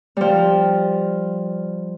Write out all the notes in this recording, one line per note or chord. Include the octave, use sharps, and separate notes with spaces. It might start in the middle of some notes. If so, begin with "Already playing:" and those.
F3 G3